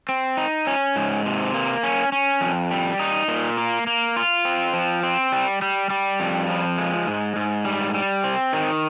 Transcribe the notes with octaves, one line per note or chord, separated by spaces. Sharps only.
C4
D#4
C#4
G#2
C3
A#3
C#4
C#4
F2
G3
D#4
A#2
A#3
A#3
F4
C4
F3
C4
G3
G3
G3
F2
F3
G#3
G#2
G#2
G3
G3
C4
D#3